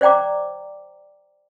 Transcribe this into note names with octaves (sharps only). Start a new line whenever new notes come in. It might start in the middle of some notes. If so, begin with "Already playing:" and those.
C5 D5 G5 A#5 D6